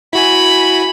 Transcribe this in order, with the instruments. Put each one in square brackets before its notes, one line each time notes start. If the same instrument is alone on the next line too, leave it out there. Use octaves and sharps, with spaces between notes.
[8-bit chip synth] E4 F#4 G#5 [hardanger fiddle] B5